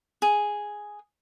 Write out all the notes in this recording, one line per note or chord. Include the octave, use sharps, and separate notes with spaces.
G#4